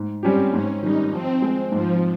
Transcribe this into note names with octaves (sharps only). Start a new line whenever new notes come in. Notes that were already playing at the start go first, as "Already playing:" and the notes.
Already playing: G#2
G3 C4 C#4 G4
G#2 C#4
D#3 G3 D#4
F3 C4
G#3 C4
G#2 F3